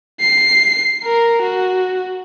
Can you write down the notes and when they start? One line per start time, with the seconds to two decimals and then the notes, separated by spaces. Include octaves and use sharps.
0.21 C7
1.04 A#4
1.42 F#4